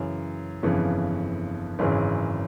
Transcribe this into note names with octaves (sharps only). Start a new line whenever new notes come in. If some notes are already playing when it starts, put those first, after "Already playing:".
Already playing: F#2 C#3 E3
G1 F2 C#3 E3
G#1 F#2 C#3 E3